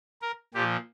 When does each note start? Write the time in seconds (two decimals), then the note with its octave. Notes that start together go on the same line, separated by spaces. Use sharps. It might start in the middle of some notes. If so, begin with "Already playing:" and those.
0.22 A#4
0.54 A#2 F3 G4